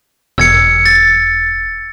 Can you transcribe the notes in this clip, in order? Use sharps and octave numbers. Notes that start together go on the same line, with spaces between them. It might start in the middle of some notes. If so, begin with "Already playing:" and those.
E1 E6 G#6 C#7
A6